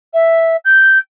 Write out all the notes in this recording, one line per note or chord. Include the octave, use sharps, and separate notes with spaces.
E5
G6